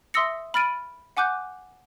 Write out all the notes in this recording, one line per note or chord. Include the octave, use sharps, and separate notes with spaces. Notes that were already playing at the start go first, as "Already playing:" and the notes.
E5 C6 D#6 E6 A#6 C#7
B5 F6 A6 D7 D#7
F#5 G#5 D6 F#6 G6